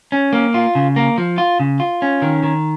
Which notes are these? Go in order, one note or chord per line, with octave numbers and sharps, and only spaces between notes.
C#4
A#3
F4
C#3
A#3
F3
F4
C#3
F4
C#4
D#3
D#3